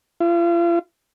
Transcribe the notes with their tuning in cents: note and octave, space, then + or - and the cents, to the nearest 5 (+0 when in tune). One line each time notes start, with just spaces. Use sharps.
F4 -40